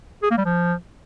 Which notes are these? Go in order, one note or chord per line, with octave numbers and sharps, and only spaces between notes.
G#4
A#3
G3
F3